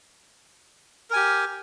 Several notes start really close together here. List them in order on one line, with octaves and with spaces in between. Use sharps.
A#4 G#5 G4